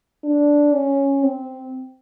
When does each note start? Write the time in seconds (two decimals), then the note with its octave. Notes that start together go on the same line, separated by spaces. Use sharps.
0.24 D4
0.74 C#4
1.23 C4